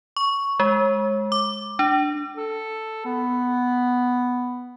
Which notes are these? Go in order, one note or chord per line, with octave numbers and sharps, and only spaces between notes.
C#6
G#3
D6
D4
A4
B3